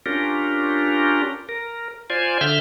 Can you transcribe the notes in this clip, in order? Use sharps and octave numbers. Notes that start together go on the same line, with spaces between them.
C#4 D4 F4 G4 A#4
A#4
F4 C5 D5 G#5
D3 E5 F6 G6